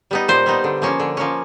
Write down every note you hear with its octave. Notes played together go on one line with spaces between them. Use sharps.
G3 B3 D#4
A#2 C5
G3 B3 D#4
D3
F3 A#3 C#4
D3
F3 A#3 C#4